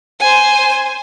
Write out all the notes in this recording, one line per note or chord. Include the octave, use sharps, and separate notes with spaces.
C5 G#5